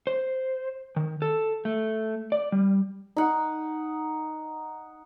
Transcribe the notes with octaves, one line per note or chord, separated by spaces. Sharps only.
C5
D#3
A4
A3
D5
G3
D#4 F#5